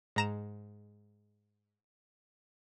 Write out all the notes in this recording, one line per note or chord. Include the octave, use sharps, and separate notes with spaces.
G#2 A#5 E7